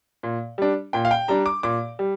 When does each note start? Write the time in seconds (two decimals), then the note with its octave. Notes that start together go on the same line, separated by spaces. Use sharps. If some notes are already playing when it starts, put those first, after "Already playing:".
0.23 A#2
0.58 G3 D4
0.93 A#2 G5
1.05 F5
1.11 G5
1.28 G3 D4 A#5
1.46 D6
1.63 A#2 D6
1.99 G3